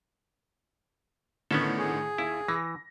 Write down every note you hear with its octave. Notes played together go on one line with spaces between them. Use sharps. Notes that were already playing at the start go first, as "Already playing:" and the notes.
A2 D3 D#3 B3 C#4 A4
G#4
D#2 E4
E3 A#6